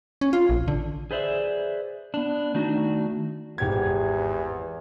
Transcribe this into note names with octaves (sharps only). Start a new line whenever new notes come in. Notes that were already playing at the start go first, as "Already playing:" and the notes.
C#4
F4
A#1
D3
G#4 B4 C5 D5 E5
B3 D4
D#3 A3 D4 D#4 F#4
G#1 E2 G4 G#6